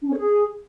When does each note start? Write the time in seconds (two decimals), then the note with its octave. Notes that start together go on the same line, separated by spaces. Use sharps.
0.02 D4
0.07 C#4
0.12 C#5
0.18 G#4